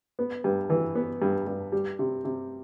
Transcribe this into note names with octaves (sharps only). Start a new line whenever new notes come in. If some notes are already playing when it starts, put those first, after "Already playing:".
B3
G2
E3
B3
G2
G2
G3
C3
C3